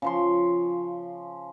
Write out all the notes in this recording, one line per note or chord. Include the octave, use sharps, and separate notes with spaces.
C#3 F3 C6